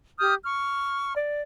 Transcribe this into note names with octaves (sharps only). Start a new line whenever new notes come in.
G4 D#6 F6 G6
C#6 F6
D5